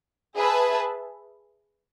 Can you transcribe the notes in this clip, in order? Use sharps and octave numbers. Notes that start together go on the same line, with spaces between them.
G#4 B4 E5 A5